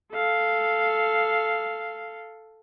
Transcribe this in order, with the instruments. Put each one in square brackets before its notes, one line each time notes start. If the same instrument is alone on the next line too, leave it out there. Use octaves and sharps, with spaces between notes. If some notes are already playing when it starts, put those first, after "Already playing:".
[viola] A4 F5